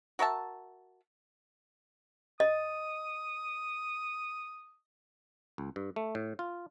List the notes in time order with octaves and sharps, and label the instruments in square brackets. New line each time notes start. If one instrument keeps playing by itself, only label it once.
[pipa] F#4 A#4 E5 A5
[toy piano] D#5 [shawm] D#6
[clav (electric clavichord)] C#2
G2
A3
A2
F4